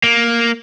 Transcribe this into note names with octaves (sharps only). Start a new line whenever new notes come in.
A#3